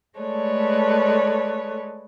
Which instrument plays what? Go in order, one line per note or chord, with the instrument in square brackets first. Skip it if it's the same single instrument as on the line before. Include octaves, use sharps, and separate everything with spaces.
[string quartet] G#3 A3 A4 B4 C#5 D5